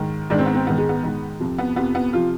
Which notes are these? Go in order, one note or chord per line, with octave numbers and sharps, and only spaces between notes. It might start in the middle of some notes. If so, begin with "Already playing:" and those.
Already playing: G#2 D#3
G#2 D#3 D4
C4
B3
C4
G#2 D#3 B3
G#3
B3
G#2 D#3
F2 C3 F3
B3
F2 C3 F3 B3
B3
C3 F3 F4